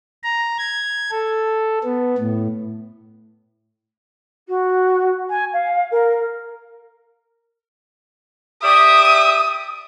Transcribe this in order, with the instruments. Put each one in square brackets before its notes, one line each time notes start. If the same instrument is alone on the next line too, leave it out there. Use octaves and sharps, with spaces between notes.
[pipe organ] A#5
G#6
A4
B3
A2
[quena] F#4
G#5
F5
A#4
[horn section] G4 D5 E5 [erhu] D#6